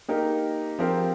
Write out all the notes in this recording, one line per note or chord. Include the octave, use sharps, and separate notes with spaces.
A#3 D#4 G4 A#4
F3 C4 G4 A#4